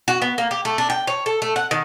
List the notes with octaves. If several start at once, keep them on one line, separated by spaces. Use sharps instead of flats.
F#4
B3
A#3
G4
A3
D4
G5
C#5
A4
A3
F#5
D#3